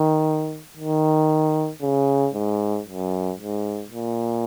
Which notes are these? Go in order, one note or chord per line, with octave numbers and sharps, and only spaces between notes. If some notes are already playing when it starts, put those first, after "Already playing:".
Already playing: D#3
D#3
C#3
G#2
F#2
G#2
A#2